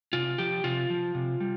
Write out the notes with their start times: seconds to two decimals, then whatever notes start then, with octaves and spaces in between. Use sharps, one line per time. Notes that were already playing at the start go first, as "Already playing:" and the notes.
0.13 C3 F4
0.38 F3 G4
0.64 C3 F4
0.90 F3
1.15 C3
1.40 G3